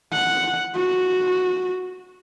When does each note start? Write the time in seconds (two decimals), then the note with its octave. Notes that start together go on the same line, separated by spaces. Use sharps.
0.13 F#5
0.76 F#4